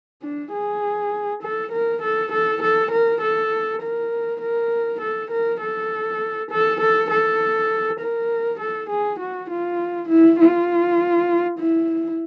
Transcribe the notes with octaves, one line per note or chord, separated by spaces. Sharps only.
D4
G#4
A4
A#4
A4
A4
A4
A#4
A4
A#4
A#4
A4
A#4
A4
A4
A4
A4
A#4
A4
G#4
F#4
F4
E4
F4
E4